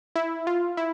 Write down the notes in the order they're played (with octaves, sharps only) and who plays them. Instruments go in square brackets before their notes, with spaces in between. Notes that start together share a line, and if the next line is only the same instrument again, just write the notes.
[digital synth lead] E4
F4
E4